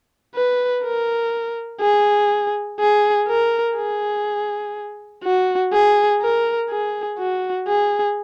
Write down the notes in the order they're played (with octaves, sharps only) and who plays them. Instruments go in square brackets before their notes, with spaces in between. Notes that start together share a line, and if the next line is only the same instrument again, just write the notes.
[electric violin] B4
A#4
G#4
G#4
A#4
G#4
F#4
G#4
A#4
G#4
F#4
G#4